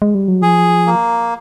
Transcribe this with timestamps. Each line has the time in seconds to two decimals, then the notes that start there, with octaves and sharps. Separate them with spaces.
0.02 G#3
0.15 G3
0.28 F#3
0.42 F3 G#4
0.87 A#3